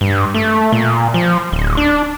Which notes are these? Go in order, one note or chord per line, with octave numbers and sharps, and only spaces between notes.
G2
A3
A#2
F3
D1
D4